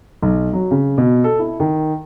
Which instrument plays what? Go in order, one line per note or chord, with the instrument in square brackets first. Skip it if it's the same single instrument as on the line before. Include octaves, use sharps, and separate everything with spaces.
[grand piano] B1
F#3
C#3
B2
A4
E4
D#3